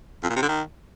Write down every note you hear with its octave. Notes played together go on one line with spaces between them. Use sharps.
F2
A#2
C3
D3
D#3